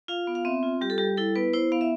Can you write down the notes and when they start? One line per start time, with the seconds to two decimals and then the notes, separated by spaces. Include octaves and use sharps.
0.08 F4 F5
0.27 B3
0.35 F5
0.45 C4 E5
0.63 F4
0.81 G3 G4
0.90 A4
0.98 G3 G4
1.17 E4 A4
1.36 B3 B4
1.53 E4 C5
1.72 B3 F5
1.81 E5